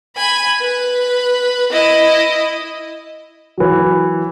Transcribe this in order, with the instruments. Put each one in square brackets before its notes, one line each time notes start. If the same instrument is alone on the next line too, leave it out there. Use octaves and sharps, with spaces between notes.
[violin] G#5 B5
B4
E4 D#5
[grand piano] E3 F#3